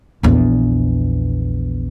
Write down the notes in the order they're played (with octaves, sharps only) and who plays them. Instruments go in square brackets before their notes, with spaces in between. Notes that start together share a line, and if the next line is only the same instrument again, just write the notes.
[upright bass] A#1 E2